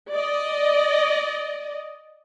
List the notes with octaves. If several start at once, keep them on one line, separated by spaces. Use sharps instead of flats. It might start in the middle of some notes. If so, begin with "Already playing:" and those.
D5 D#5